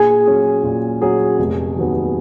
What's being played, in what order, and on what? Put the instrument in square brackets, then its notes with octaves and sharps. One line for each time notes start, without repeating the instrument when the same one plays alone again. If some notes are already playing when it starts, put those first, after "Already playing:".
Already playing: [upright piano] A#2 [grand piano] G#4 G#5
[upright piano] F#3 C#4 G#4
A#2
F#3 C#4 G#4
F1
D#2 D#3 F#3 B3